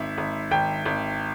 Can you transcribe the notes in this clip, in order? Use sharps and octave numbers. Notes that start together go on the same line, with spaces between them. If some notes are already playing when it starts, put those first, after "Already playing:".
Already playing: G#1 E5
G#1
G#1 G5
G#1